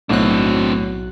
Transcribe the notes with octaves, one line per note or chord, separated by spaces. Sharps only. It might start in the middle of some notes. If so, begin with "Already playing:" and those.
B1 A2 F#3 C4 D4 F#6